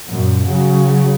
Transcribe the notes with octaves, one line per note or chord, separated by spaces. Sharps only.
F#2 A#2
C#3 F#3